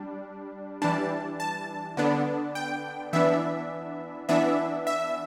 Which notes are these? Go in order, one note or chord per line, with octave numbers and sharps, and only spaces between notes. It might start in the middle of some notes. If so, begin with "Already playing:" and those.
Already playing: G3 D4
E3 G3 D4 A5
A5
D3 B3 D4
G5
E3 B3 D4 E5
E3 B3 D4 E5
E5